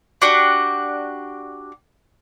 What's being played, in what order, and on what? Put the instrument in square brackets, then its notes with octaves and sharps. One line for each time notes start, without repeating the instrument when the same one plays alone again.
[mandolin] D4 F#4 G4